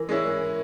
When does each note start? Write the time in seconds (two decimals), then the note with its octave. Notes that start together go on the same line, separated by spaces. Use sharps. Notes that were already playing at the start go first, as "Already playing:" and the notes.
Already playing: E3 A#4
0.09 G#3 C#4 E4